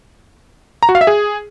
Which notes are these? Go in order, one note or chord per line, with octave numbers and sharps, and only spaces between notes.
A#5
F#4
F5
E5
G#4